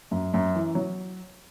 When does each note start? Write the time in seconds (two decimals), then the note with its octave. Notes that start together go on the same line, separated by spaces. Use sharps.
0.11 F#2
0.34 F#2
0.54 E3
0.75 F#3